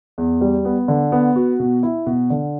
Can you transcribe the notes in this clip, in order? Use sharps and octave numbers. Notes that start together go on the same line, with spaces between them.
E2
G3
B3
D3
B3
F#4
B2
E4
B2
D3